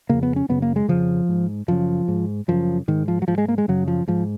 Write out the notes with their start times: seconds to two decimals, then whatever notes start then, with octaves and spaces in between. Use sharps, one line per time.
0.09 F2 C#3 A#3
0.23 B3
0.36 C#4
0.49 F#2 C#3 B3
0.62 A#3
0.76 G#3
0.88 F2 C#3 F3
1.29 G#2
1.68 F#2 C#3 F3
2.08 G#2
2.48 F#2 C#3 F3
2.88 G#2 D#3
3.08 F3
3.22 F#3
3.28 G#2 F3
3.38 G#3
3.48 A#3
3.58 G#3
3.68 F#2 C#3 F#3
3.88 F3
4.08 G#2 F3